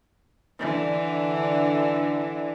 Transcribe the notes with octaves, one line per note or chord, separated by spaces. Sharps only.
D3 E3